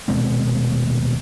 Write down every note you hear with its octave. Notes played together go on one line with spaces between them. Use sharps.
D#1 B2 G#3 C4